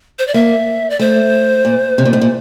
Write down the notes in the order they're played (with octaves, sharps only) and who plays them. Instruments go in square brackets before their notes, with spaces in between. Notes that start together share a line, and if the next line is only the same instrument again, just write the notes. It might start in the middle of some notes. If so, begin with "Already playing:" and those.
[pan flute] C5
D5
[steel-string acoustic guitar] A#3 [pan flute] E5
[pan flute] D5
[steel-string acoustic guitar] A3 [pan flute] C5
[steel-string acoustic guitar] A#2
C3
A#2
A2
A#2